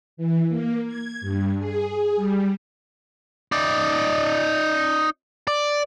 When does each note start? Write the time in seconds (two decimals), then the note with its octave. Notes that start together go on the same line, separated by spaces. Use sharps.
0.17 E3
0.48 A#3
0.86 G#6
1.21 G2
1.58 G#4
2.16 G3
3.52 D#4 D5
5.48 D5